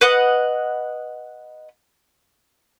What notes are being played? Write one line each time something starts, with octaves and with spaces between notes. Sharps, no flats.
B4 D#5 F#5 D#6